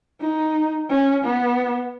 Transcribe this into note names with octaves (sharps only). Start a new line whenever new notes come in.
D#4
C#4
B3